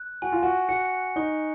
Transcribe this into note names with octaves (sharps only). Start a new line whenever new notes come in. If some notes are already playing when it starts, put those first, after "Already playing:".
Already playing: F#6
F#4 G#5
F4
F#4
F#4 C#7
D#4 C#6